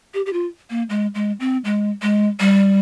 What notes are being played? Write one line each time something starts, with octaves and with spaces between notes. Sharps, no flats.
G4
G4
F4
A#3
G#3
G#3
C4
G#3
G#3
G3